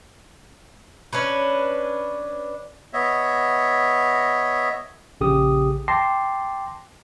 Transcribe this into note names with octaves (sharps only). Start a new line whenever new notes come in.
C#4 D4 B4
B3 C#5 D#5 E5
A#1 C#3 G4 G#4 D#6
G5 A5 C6 D6 A#6 C7